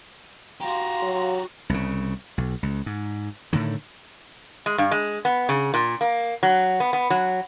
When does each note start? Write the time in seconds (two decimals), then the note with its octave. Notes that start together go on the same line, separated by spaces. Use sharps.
0.60 F#4 G4 F5 A#5 C6
1.02 F#3
1.70 C2 C#3
2.38 B1
2.63 C#2
2.86 G#2
3.53 A2 D3 D#3
4.66 G#3
4.78 G2
4.91 G#3
5.25 B3
5.49 C#3
5.74 A#2
6.01 A#3
6.43 F#3
6.80 B3
6.93 B3
7.10 F#3